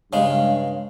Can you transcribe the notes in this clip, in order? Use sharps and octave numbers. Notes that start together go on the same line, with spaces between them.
G2 C#3 G#3 F5